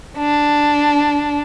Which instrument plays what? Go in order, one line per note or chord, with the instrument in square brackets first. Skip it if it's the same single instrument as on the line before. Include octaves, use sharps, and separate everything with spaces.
[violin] D4